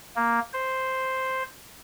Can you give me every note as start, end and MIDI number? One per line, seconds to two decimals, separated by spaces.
0.16 0.40 58
0.53 1.43 72